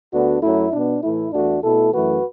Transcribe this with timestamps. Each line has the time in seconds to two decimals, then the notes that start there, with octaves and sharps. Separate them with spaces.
0.13 D2 D3 B3 D4 F#4
0.42 F#2 F#3 A3 E4
0.73 B2 B3 D4
1.03 A2 E3 A3 E4
1.33 E2 E3 A3 D4 F#4
1.63 B2 A3 E4 A4
1.93 F#2 E3 A3 F#4 B4